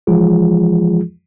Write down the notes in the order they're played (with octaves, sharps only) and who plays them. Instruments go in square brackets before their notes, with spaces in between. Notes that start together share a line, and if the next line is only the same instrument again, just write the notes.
[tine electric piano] E3 F3 G#3 F4 G#4